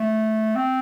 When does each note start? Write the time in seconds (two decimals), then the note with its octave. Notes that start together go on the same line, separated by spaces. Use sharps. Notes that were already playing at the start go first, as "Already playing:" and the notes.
Already playing: A3
0.55 C4